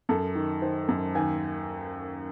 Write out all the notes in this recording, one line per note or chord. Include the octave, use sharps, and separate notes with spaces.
F#2 A4
D#3
D#3 C5
F#2
D#2 G#5